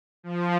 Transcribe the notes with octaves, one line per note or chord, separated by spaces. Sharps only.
F3